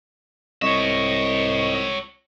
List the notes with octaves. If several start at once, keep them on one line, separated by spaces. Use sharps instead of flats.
C2 C#5 D#5 E5 C#6